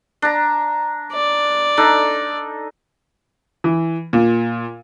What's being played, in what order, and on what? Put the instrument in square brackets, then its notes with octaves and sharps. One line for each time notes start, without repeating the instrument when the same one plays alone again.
[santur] D4 A#5
[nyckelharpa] D5
[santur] D4 D#4 A4
[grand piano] E3
A#2